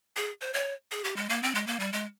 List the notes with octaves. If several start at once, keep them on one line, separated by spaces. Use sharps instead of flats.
G#4
C5
C#5
G#4
G4
G#3
A#3
C4
G#3
A#3
G3
G#3